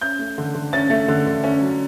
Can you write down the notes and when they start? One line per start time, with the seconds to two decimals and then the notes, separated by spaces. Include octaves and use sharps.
0.01 C#4 G6
0.19 A3
0.38 D3
0.54 D3
0.73 C#4 A6
0.90 A3
1.08 D3
1.26 D3
1.44 C#4
1.61 F#3